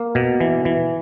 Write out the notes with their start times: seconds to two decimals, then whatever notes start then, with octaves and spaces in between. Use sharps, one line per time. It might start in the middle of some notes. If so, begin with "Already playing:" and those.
Already playing: A#3
0.15 B2
0.40 E3
0.65 E3